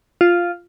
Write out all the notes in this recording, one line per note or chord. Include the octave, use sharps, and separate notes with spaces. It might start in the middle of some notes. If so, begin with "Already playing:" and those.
F4